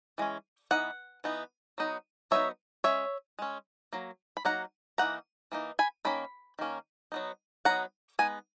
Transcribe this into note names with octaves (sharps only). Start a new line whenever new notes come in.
E3 G#3 C#4
E3 B3 D#4 F#5
E3 B3 D#4
F#3 B3 D#4
F#3 B3 D#4 C#5 E5
G#3 C#4 C#5 E5
G#3 C#4
F#3 A#3
B5
F#3 A#3 D#4 F#5 A#5
E3 A#3 D#4 F#5 A#5
E3 A#3 D#4
G#5 B5
D#3 A#3 C#4 B5
D#3 A#3 C#4
F#3 B3 D#4
F#3 B3 D#4 F#5 A#5
G#3 B3 D#4 G#5